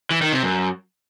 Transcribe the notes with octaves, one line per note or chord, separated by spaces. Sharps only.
E3
D#3
C3
F#2